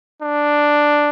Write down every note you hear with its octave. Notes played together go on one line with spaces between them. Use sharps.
D4